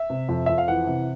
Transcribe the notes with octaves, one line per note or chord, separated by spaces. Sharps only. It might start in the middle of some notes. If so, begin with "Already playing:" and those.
Already playing: E5
C3
F2
F2 E5
F5
E3 F#5
C3